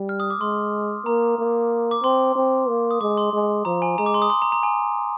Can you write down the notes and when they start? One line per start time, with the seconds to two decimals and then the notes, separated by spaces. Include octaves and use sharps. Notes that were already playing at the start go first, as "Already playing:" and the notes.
Already playing: G3
0.09 F6
0.20 D#6
0.30 D6
0.40 G#3 C6
1.06 A#3 A#5
1.39 A#3
1.91 D6
2.03 C4 C6
2.36 C4
2.68 A#3
2.91 D#6
3.01 G#3 D6
3.17 C6
3.33 G#3
3.65 F3 A#5
3.82 G#5
3.98 G#3 A#5
4.06 D6
4.14 C6
4.22 D#6
4.30 C6
4.42 A#5
4.52 A#5
4.63 G#5